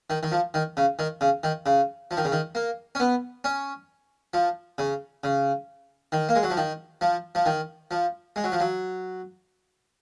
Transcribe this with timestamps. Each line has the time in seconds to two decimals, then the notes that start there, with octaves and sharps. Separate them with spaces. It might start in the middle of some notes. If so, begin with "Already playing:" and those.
0.10 D#3
0.23 D#3
0.32 F3
0.54 D#3
0.77 C#3
0.99 D#3
1.21 C#3
1.43 D#3
1.66 C#3
2.11 F3
2.17 D#3
2.25 C#3
2.32 D#3
2.55 A#3
2.95 C#4
3.00 B3
3.44 C#4
4.34 F3
4.78 C#3
5.24 C#3
6.12 D#3
6.29 A#3
6.35 G#3
6.43 F#3
6.50 F3
6.57 D#3
7.01 F3
7.35 F3
7.46 D#3
7.91 F3
8.36 G#3
8.44 F#3
8.52 F3
8.60 F#3